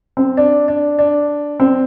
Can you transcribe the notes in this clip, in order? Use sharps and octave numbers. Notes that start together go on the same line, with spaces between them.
C4
D4
D4
D4
C4